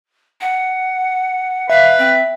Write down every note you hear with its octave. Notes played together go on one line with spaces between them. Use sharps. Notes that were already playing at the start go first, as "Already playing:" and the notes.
F#5
B4 E5 F5
C4